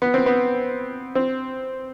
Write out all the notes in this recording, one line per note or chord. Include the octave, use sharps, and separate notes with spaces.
B3
C4
B3
C4